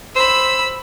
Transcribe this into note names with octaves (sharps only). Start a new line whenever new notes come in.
C5 B5 E6